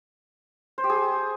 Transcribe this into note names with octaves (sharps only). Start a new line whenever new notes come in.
C5
G4
G#4